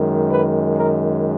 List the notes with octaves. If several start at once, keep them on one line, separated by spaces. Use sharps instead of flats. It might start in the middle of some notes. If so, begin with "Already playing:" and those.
Already playing: F#2 D#3 G#3
B4
A#4